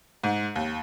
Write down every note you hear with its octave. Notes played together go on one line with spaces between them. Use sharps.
G#2
D#2